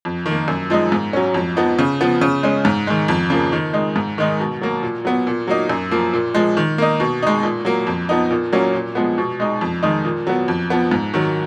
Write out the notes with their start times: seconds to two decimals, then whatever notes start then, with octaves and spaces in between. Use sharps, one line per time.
0.05 F2
0.26 D#3
0.31 A#3
0.48 F#2
0.70 F3 G#3 D#4
0.92 G#2
1.13 F#3 C#4
1.34 F2
1.56 F3 B3 D#4
1.79 C#3
2.01 F3 B3
2.21 C#3
2.43 G#3 C#4
2.65 G#2
2.87 D#3 G#3
3.08 F2
3.30 C#3 F3 A#3
3.52 D#3
3.74 G#3 D#4
3.96 G#2
4.18 D#3 G#3 D#4
4.40 B2
4.61 F#3 A#3
4.83 A#2
5.05 F#3 B3
5.27 A#2
5.47 F#3 A#3 D#4
5.69 F#2
5.91 F3 A#3
6.13 A#2
6.35 F3 G#3
6.57 D#3
6.78 A#3 D#4
7.00 B2
7.22 G#3 D#4
7.43 A#2
7.65 F#3 A#3
7.87 F2
8.09 F3 B3 D#4
8.30 A#2
8.53 F#3 A#3 C#4
8.73 A#2
8.95 F3 G#3 B3
9.18 B2
9.40 G#3 D#4
9.61 F2
9.83 D#3 G#3 D#4
10.05 A#2
10.27 F#3 B3
10.48 F2
10.70 F3 B3
10.91 G#2
11.14 D#3 F#3